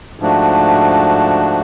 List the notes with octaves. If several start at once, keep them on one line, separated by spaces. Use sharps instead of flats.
G#2 F3 A3 D4 F#4